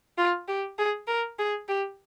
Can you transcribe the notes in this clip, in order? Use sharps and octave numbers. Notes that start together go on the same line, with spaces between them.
F4
G4
G#4
A#4
G#4
G4